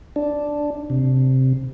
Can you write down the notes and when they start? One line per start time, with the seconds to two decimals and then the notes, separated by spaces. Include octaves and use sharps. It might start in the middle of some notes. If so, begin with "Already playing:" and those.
0.16 D4
0.90 C3